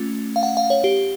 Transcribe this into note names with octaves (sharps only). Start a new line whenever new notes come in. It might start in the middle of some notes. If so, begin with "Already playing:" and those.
Already playing: A3 C#4 F4
F5
F#5
F5
C#5
G4